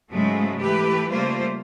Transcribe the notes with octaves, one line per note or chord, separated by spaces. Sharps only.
G#2 C#3 F#3 G#3 A3
E3 A3 G4 B4
C#3 G3 A3 A#3 F4 C5